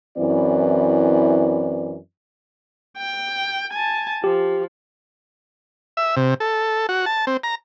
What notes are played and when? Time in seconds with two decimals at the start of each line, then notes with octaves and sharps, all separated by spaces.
0.18 F#2 E3 C4 E4 B4 D5
2.97 G5
3.72 G#5 A5
4.24 F3 G4
5.97 E5
6.16 C3
6.40 A4
6.89 F#4
7.06 A5
7.27 C4
7.43 A#5